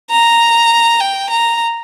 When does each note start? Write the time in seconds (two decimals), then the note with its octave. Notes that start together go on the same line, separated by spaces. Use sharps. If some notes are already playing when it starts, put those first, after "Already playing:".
0.11 A#5
1.00 G5
1.30 A#5